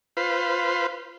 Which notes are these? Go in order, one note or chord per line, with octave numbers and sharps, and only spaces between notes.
F4 B4 C5